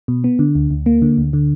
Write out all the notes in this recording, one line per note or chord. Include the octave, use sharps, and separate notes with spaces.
B2
B3
D3
D2
D2
A#3
D3
D2
D3